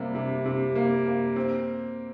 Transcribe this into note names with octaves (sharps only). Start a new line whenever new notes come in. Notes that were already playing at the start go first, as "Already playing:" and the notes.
Already playing: C3 G3 A#3
C3
C3
A#3
A#3
C4